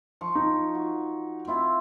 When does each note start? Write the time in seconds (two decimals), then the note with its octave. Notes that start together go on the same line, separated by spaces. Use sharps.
0.21 F3 C#6
0.35 D#4
0.75 F#4
1.47 C4 E4 F4